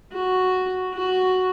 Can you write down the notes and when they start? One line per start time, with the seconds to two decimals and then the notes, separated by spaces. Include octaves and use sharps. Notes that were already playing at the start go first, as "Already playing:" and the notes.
0.12 F#4
0.94 F#4